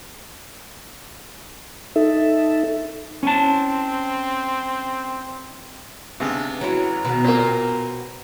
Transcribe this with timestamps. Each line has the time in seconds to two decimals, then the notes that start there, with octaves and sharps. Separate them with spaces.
1.96 D#4 A4 E5
3.23 C4 C#4 A5
6.20 C#2 C3 B3 D4
6.61 F#3 E4 A#5
7.05 B2 D#3 B4
7.24 A#2 A#3 C4